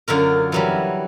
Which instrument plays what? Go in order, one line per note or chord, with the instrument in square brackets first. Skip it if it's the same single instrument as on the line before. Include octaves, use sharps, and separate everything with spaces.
[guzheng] F#2 D3 F4 A#4
E3 F#3 G3